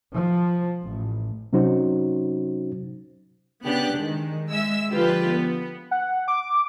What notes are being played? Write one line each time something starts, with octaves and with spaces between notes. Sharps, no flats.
F3
A1
C3 F#3 C#4 D#4 F#4 C5
C#3 B3 D4 G4 F#6
D#3 G#3
G#3 E5 E6
D3 F3 G#3 F4 G4 B4
B3
F#5
D6